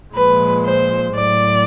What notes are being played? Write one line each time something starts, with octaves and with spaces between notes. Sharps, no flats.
A#2 F3 G#3 B4
C5
A2 F#3 D5